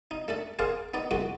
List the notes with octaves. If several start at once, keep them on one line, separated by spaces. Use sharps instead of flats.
D#4
A3 D4 A4
G#4 A#4 C5 D5 F5
B3 D#4 D5
C2 G#3 F#4 G4 D6